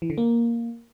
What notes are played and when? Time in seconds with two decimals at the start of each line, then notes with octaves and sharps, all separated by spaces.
0.02 E3
0.10 D3
0.18 A#3